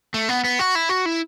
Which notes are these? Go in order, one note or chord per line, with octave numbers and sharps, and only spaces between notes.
A3
B3
B3
F#4
E4
F#4
E4